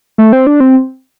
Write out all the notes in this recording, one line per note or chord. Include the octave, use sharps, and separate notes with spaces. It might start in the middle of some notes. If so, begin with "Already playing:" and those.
A3
C4
D4
C4